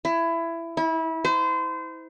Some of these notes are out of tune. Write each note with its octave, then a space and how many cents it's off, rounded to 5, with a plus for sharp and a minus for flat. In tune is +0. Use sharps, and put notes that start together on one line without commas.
E4 +20
E4 -25
C5 -30